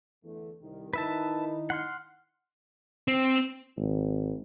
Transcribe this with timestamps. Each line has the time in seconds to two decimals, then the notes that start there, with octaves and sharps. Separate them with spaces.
0.24 E2 D3 A3
0.61 C2 D#3
0.93 D#3 D#4 E4 B4 E5 A5
1.70 F#5 C6 F6
3.08 C4
3.77 G#1